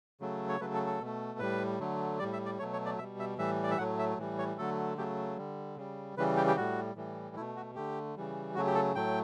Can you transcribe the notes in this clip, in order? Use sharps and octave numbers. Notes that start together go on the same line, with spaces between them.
C#3 F#3 A3
C#5
C#3 F#3 A3 B4
A4
A4
B2 A3
A2 G3 B4
D3 F#3 A3
A2 G3 D5
E5
D5
B2 F#3 A3 C#5
C#5
D5
B2 G3 E5
E5
A2 E3 G3 E5
D5
E5
A2 F#3 A3 F#5
E5
A2 E3 G3
C#5
D3 F#3 A3 A4
C#3 F#3 A3 G4
D3 G3
C#3 G3
C#3 E3 G3 B4
G4
G4
A2 G3 F#4
A2 E3 G3
B2 A3 E4
F#4
D3 A3 G4
C#3 E3 G3
C#3 F#3 A3 F#4
G4
A4
A2 F#3 A3 G5